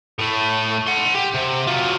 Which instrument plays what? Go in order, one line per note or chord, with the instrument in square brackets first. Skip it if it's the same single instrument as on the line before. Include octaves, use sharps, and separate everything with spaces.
[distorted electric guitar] A2 A3
F#5 C6
G4
C3
F#3 F4